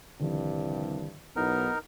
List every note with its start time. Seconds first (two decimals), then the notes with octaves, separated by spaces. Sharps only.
0.20 C2 G2 D3 D#3 F3
1.36 B1 B3 D#4 E4 A#4